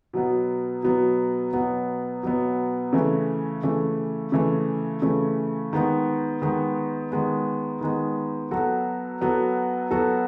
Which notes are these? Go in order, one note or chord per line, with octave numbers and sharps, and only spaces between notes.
B2 F#3 B3
B2 F#3 B3
B2 F#3 B3
B2 F#3 B3
C#3 E3 A3
C#3 E3 A3
C#3 E3 A3
C#3 E3 A3
D#3 G#3 B3
D#3 G#3 B3
D#3 G#3 B3
D#3 G#3 B3
F#3 B3 F#4 A4
F#3 B3 F#4 A4
F#3 B3 F#4 A4